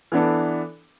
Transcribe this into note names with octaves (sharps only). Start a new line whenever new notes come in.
E3 B3 D4 A4